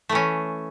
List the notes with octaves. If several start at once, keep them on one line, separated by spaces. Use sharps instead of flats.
E3 A3 C#4